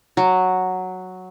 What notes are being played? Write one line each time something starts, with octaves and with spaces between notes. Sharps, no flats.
F#3